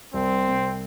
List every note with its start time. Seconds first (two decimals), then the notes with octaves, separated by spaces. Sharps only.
0.14 C2 C4
0.47 C3